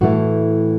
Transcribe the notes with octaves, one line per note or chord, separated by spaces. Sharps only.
A2 E3 A3 F#4